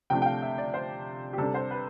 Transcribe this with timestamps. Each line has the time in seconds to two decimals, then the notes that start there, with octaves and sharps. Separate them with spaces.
0.10 C3 F3 A3 D4 G5
0.22 G5
0.25 F5
0.42 E5
0.58 D5
0.74 C5
1.33 G4
1.38 C3 G3 D4 A4
1.54 C5
1.71 B4